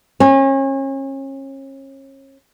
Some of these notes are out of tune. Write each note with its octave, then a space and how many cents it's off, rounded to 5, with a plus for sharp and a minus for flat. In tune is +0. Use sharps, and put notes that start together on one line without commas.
C#4 -35